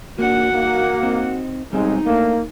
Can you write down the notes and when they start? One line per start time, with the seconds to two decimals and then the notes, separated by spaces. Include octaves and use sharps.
0.19 A#3 D4 F#4 F#5
0.54 A#3 D#4
1.03 C4 D#4
1.73 B1 G3 G#3 C4 D#4
2.06 A3 A#3 D4